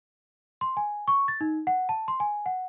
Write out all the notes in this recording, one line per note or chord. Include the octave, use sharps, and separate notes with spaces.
C6
G#5
C#6
A6
D#4
F#5
A5
C6
G#5
F#5